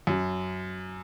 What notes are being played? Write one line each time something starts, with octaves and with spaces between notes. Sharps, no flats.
F#2